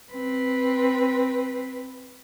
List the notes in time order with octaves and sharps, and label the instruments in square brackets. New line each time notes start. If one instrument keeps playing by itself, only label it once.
[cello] C4 B4